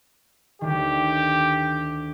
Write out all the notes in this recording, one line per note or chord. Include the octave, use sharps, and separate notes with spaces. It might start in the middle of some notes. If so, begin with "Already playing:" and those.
D2 D#3 G4